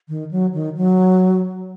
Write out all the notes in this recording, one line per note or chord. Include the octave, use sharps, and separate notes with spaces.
D#3
F#3
D#3
F#3